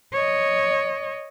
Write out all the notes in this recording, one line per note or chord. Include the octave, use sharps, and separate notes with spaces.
C#5 D#5